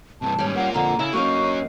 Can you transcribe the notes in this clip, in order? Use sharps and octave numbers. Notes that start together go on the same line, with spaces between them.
G2 C3 A5
D#2 G#2 G3 C#4
A#3 F4 F#5
F2 D3 A#5
C#3 E4
F#3 A#3 C#4 D#4 F5 C#6